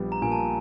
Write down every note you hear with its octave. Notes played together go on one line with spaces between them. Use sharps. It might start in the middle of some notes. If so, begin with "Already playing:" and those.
Already playing: A#1 G3 B3
A#5
A#2 G#5
A5